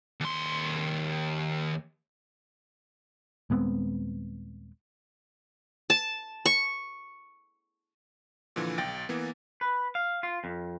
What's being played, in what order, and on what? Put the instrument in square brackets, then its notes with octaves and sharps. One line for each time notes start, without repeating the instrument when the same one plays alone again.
[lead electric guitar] D#2 C6
[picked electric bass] D#1 G#3 B3 C4
[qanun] A5
C#6
[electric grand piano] A#2 D3 E3 F3
B1 G5 A6 A#6 D7
E3 A#3 B3
[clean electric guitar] B4
F5
F4
F2